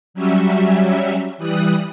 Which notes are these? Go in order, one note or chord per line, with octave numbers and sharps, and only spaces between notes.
F#3 G3 C#4 E5
E3 G3 D#6 F#6